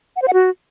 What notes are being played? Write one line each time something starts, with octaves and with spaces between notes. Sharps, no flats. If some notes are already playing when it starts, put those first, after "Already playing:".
F#5
C5
F#5
F#4